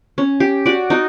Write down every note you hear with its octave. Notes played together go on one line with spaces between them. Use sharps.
C#4
G4
F#4 D5
D#4 F#4